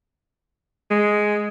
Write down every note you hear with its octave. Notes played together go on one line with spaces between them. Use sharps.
G#3